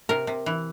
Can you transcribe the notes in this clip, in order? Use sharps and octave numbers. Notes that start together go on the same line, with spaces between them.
C3 A#4
C3
E3